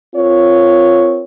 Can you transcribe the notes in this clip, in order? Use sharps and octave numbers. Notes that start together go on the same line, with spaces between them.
C4 F4 A#4 C#5